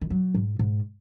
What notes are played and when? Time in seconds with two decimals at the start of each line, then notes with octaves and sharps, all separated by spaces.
0.01 D#3
0.10 F#3
0.34 G#2
0.59 G#2